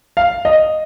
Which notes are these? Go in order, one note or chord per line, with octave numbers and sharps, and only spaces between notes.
F5
D#5